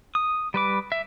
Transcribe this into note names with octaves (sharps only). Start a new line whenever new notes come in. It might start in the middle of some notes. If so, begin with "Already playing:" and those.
D#6
G3 B4 D6
E5